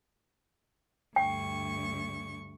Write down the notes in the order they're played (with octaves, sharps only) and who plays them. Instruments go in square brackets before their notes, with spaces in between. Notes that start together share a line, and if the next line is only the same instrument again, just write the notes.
[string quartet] D2 G2 C#6 [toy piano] G5